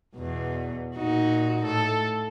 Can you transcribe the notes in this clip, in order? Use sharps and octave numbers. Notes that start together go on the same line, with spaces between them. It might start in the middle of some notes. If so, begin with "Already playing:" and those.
E2 B2
A#2 D#4 F#4
A2 A4